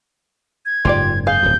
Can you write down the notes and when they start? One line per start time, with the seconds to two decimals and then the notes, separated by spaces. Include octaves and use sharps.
0.66 G#6
0.85 F#1 G#2 F4 G4 D5
1.27 G#4 F5 G6
1.43 D1 F#2